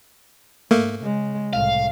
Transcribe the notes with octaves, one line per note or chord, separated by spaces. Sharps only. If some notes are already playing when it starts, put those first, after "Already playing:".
G#2 A3 A#3
C#3 G#3
C2 A2 F5